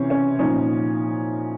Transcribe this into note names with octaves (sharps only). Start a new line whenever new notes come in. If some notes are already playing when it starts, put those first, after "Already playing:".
Already playing: C3 E3 C4 C#4
C#4
A#2 F3 C#4 D#4